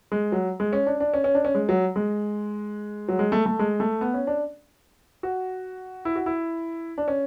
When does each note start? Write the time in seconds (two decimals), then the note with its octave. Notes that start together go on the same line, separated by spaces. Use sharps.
0.12 G#3
0.32 F#3
0.60 G#3
0.73 C#4
0.87 D4
1.00 D4
1.14 C#4
1.24 C#4
1.35 D4
1.45 C#4
1.55 G#3
1.69 F#3
1.96 G#3
3.09 F#3
3.19 G#3
3.32 A3
3.46 A3
3.59 G#3
3.80 A3
4.01 B3
4.14 C#4
4.27 D4
5.23 F#4
6.05 E4
6.16 F#4
6.26 E4
6.98 D4
7.08 C#4